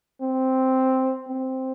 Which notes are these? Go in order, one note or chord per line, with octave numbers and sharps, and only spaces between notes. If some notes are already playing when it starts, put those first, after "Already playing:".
C4
C4